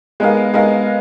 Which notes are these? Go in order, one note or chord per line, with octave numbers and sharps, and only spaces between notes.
G#3 B3 D#4 A#4 F5
G#3 B3 D#4 A#4 F5